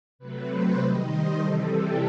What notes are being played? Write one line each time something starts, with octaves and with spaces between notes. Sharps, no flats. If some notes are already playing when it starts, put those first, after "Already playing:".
C3 F#3 A3 B4
C5
D#3 G3 D#5
C5
C3 E3 G3 A4
G4